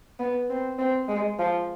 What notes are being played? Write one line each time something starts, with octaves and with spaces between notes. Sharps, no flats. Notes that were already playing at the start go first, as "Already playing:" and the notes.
B3
C4
C4
G#3
F3